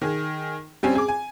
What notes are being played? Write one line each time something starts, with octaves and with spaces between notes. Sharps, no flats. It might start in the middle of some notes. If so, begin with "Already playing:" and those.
D#3 G#4
G3 C4 C#4 G#5
G#4 D6
G#5